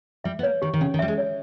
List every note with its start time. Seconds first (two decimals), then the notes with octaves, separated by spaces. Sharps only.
0.24 G3 E5
0.39 B3
0.43 A#3 C#5
0.62 D#3 G4
0.73 D#3
0.81 C#3 C#4
0.94 D#3
0.99 G3 E5
1.08 G#3
1.18 C#5